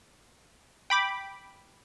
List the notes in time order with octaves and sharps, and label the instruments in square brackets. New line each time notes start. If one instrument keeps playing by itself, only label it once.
[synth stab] G5 B5 D6